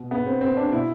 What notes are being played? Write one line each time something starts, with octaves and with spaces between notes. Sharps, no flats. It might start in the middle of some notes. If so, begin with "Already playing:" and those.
Already playing: B2
B3
C4
C4
D4
B2 E4